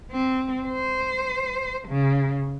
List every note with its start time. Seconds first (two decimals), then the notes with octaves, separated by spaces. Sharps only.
0.12 C4
0.68 C5
1.88 C#3